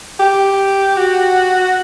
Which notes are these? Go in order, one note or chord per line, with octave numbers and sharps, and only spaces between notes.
G4
F#4